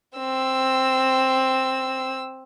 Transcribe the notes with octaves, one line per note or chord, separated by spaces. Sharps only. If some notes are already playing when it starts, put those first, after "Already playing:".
C4 E6